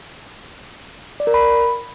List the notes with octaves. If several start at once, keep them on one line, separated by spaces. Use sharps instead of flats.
D5
A#4
B5